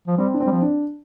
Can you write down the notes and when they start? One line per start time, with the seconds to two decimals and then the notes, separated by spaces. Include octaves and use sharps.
0.07 F3
0.17 G3 C4
0.34 D4
0.40 C4
0.47 G3
0.51 F3
0.62 D4